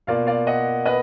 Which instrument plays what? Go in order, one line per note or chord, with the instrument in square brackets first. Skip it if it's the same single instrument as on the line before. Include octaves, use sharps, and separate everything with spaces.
[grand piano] B2 A#3 F4 D5 F5
D5 F5
D#5 F#5
B4 D#5